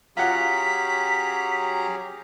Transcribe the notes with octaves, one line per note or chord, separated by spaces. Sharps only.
F#3 C#4 F4 G4 G#4 F#5 A#5 B6